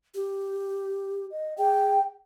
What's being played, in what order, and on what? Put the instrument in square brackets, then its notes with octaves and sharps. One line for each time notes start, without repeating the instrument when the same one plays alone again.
[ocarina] G4
[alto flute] D#5
[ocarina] G#4 [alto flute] G5